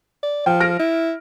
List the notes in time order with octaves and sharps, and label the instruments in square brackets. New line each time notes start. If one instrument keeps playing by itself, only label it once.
[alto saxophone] D5
[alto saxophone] F3 [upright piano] G5
[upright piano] F6 A#6 D7
[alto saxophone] E4